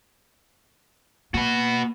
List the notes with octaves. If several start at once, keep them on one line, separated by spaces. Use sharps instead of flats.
A#3 F#4 B4